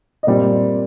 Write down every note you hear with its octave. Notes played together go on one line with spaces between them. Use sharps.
D#5
A#2 G3 C4 D5